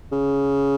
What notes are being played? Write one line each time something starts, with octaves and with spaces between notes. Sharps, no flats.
C#3